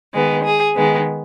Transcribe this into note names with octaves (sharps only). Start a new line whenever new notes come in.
D#3 G#3 B3
G#4
D#3 G#3 B3